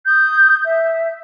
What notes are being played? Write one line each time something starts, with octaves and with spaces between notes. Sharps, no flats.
D#6 G6
E5